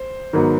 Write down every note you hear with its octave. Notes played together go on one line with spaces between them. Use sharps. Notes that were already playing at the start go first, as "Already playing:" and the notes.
Already playing: C5
G#2 D#3 F#3 B3